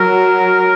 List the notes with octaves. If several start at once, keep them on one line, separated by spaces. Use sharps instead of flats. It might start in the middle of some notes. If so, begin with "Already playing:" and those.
Already playing: F#3 A#4